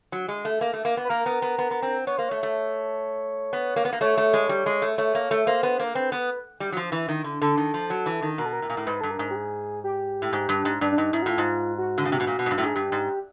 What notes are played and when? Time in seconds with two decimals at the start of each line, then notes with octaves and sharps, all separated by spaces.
0.12 F#3
0.28 G#3
0.45 A3
0.61 A#3
0.73 A3
0.85 A#3
0.97 B3
1.05 B4
1.09 A#3 A#4
1.26 B3
1.42 B3
1.58 B3
1.71 B3
1.82 C4
2.07 B3 C#5
2.18 A#3 C5
2.29 A3 C#5
2.43 A3
3.53 B3
3.76 A#3
3.85 B3
3.93 A#3
4.01 A3 C#5
4.17 A3
4.33 G#3
4.49 G3
4.66 G#3
4.82 A3
4.98 A3 C#5
5.15 A#3
5.31 A3
5.47 A#3 C5
5.63 B3
5.79 A#3 A#4
5.95 C4 B4
6.12 B3
6.60 G3
6.72 F#3
6.77 F3
6.92 E3
7.08 D#3
7.24 D3
7.41 D3 A4
7.57 D#3
7.74 F3
7.90 F#3
8.06 E3
8.22 D#3
8.38 B2 A#4
8.46 A4
8.53 A#4
8.62 A2
8.70 A#2
8.77 A2
8.87 G#2 B4
9.01 G2 A4
9.11 A#4
9.19 G#2
9.31 G4
9.36 G#4
9.84 G4
10.22 A2
10.33 G#2
10.49 G2
10.65 G#2
10.81 G2 D4
10.92 D4
10.98 G2 D#4
11.13 G#2 E4
11.22 F#4
11.26 A2 F4
11.38 G#2
11.78 F#4
11.98 D3
12.05 C#3
12.12 C3
12.20 B2
12.27 A#2
12.39 B2
12.46 G#2
12.51 G2
12.58 A2
12.63 G#2 G#4
12.75 G2 G4
12.92 G#2